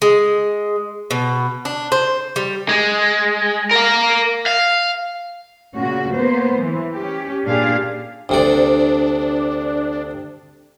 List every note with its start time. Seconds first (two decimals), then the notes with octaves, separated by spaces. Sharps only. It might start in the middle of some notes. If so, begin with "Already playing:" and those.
0.02 G#3
1.11 B2
1.65 D4
1.92 C5
2.36 G3
2.69 G#3
3.71 A#4 F5
4.46 F5
5.76 A#2 C#3 F#4
6.15 A#3 B3 C5
6.56 E3
6.93 C#4 G4
7.46 A#2 D4 G4 G#4 F5
8.29 D2 C3 D4 D5